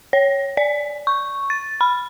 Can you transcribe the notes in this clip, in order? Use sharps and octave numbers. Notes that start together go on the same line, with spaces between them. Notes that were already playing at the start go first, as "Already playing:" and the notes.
C#5
D5
C#6
A6
B5